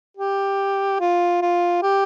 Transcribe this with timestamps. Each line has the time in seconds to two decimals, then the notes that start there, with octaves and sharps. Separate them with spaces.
0.17 G4
1.00 F4
1.42 F4
1.83 G4